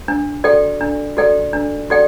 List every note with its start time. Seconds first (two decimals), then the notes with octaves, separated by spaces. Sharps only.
0.08 D4
0.44 F#4 A4 D5 G5
0.81 D4
1.17 F#4 A4 D5 G5
1.53 D4
1.90 F#4 A4 D5 G5